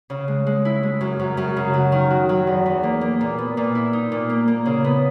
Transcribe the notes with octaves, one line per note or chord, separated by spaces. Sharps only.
C#3
G#3
G#3
E4
G#3
F#2
F#2
F#2
C#3
F#3
D#3
F#4
F#3
E2
E2
A#3
A#3
A#2
B3
A#2
E4
D#4
A#2
A#3
A#3
C#3
B3